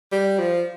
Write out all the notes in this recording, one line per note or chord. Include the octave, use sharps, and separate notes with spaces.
G3
F3